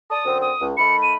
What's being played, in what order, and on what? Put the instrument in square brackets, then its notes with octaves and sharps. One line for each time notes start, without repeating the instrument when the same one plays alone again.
[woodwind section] D5 A5 [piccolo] D#6
[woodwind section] F#2 D3 C4
[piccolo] D#6
[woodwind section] C#2
[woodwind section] D#3 A3 B5 [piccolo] C#7
[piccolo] D#7